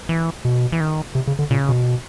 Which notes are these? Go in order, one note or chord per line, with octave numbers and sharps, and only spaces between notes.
E3
B2
E3
D#3
C3
C#3
D3
A#2 C#3
B2